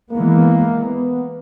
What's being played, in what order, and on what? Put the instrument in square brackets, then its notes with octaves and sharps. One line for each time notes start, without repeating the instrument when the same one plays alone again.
[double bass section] E3 G#3 B3 [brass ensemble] A#3
[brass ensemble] B3